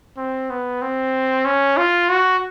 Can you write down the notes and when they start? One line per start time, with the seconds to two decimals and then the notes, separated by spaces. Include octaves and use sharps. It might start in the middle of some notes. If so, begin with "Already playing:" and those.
0.17 C4
0.50 B3
0.82 C4
1.45 C#4
1.77 F4
2.09 F#4